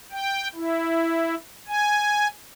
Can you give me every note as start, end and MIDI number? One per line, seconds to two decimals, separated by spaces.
0.11 0.48 79
0.55 1.35 64
1.68 2.28 80